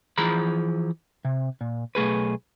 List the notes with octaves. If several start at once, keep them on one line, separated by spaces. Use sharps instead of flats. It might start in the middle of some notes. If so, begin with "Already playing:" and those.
E3 F3 G#4 A#5 B5
C3
A#2
B1 A3 G#4 B4